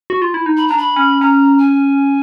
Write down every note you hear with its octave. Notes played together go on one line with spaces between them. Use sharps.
F#4
F4
E4
D#4
B5
D4 A#5
B5
C#4
C#4 A#5
G#5